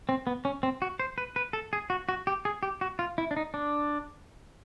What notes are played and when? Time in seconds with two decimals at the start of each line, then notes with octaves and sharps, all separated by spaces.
0.09 C4
0.27 B3
0.45 C#4
0.63 C4
0.82 F#4
1.00 C5
1.18 B4
1.36 B4
1.53 A4
1.73 G#4
1.90 F#4
2.09 F#4
2.27 G4
2.45 G#4
2.63 G4
2.81 F#4
2.99 F4
3.18 E4
3.31 D4
3.36 D#4
3.54 D4